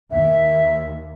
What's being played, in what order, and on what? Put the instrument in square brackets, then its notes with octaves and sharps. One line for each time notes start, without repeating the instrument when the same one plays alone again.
[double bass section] D#2 [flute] E5